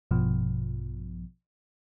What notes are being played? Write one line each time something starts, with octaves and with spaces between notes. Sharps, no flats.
A#1 G2 B2 F3